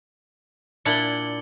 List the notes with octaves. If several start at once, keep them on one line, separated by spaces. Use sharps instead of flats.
A#2 D4 E4 C#7 F#7 G7